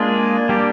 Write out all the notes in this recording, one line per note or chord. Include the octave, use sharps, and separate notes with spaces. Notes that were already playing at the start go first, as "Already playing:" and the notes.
Already playing: G#3 A#3 D4 F4 G#4
G3 D4 G4